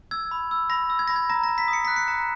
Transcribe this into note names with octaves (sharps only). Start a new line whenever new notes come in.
E6 G#6
B5
E6
B5 A#6
E6
G#6
B5 A#6
G#6
A#5 A#6
A#6
A#5
B6
D#6
C#7
F#6 B6
C#7
A#5